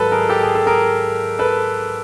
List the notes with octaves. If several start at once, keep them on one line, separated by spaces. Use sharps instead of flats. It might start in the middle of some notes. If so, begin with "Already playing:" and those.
Already playing: G#2 D#3 F#3 A4 B4
G#4 A#4
G4 A4
G#4
A4
G#4 A#4
A4 B4